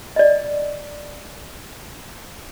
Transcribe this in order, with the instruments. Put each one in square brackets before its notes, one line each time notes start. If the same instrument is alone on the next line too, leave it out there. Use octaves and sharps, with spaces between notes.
[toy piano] D5 D#5